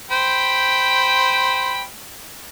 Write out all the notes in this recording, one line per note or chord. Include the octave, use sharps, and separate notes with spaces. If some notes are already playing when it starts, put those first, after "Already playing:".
C5 G5 B5